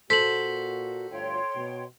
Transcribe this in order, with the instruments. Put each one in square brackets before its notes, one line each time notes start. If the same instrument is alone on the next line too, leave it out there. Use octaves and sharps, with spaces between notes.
[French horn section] A#2 F#4 [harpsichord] A4 C5 [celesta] B6 F#7
[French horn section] D2 G2 F4 [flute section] C#5 G5 C6
[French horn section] B2